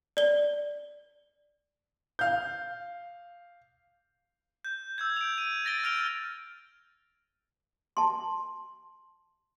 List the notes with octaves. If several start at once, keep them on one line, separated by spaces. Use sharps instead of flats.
D5 G7
F5 G6
G6
E6 G6 G#6
D7 F7
D#7
A6 A#6 D7 G7
F6 A#6 D7 F7 G7
A5 C6